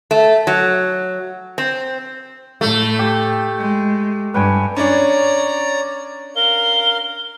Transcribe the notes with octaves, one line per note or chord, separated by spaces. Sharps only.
A3
F#3
C4
A2 A3
G4
G#3
G2 B4 G5 G#5
C#4 D4 C#5 D5 A#5
A#4 F5 G7